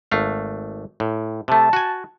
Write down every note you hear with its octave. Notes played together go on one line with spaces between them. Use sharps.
G#1 A3 F5
A2
C3 A3 A5
F#4 G#5